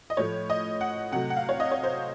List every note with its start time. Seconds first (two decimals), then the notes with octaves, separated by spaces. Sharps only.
0.10 D#5
0.17 A2 F3 A3 C#5
0.50 D#5
0.81 F#5
1.12 C3 F#3 A3 F#5
1.30 F#5
1.37 F5
1.49 C#5
1.60 D#5
1.72 C#5
1.84 C5